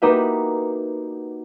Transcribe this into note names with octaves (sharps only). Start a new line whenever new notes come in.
A#3 D#4 F#4 G4 B4 E5